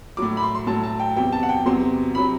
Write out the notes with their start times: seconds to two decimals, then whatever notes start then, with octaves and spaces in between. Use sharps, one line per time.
0.17 A2 F#3 D6
0.37 B5
0.43 C6
0.55 C6
0.67 A2 F#3 A5
0.83 A5
1.00 G5
1.16 E2 C3 F#3 G5
1.32 A5
1.43 F#5
1.49 G5
1.66 E2 C3 F#3 C6
2.15 C3 F#3 B5